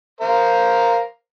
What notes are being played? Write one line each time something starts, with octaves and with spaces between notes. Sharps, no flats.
A#4 C5 F5